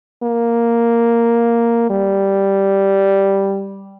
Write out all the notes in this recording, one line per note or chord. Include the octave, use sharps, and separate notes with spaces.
A#3
G3